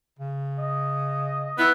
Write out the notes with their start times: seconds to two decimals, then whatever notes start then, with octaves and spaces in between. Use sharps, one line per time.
0.19 C#3
0.58 D#5
1.58 B3 E4